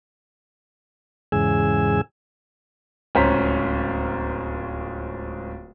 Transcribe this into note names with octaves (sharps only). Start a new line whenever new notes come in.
E2 G#2 C#3 G#4 G#5 E6
D1 C#2 C#4 C5 A#5 B6